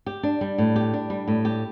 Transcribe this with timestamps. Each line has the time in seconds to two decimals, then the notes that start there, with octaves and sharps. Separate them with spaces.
0.06 G4
0.23 D4
0.41 G3
0.58 A2
0.76 G4
0.94 D4
1.10 G3
1.28 A2
1.45 G4